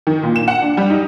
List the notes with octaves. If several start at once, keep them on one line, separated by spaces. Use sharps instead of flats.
D#3
A#2
E7
F#5
D4
G3
D#4